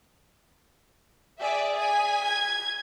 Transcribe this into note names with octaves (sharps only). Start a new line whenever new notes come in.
G#4 D5 E5
G#5 B6
G#6